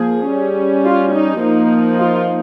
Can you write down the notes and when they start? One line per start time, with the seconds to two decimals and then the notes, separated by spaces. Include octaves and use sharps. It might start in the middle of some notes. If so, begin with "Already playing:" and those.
Already playing: F3 A#3 G#4
0.27 G3 C#4
0.85 F4
1.14 D#4
1.41 F3 A#3 D#4
1.99 F4